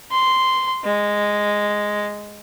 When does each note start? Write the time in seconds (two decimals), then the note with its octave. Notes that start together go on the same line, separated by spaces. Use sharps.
0.11 C6
0.84 G#3